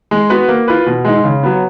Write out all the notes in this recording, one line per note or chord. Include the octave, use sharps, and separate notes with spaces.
G#3
B3 F#4 B4
A#3
F4 B4
B2
G#3 D#4
C#3
F#3 B3